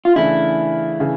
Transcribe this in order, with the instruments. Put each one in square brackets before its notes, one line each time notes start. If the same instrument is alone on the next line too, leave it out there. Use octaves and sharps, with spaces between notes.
[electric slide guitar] F4
[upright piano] C#3 E3 A3 D4 [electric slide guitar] E4
[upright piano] C#3 E3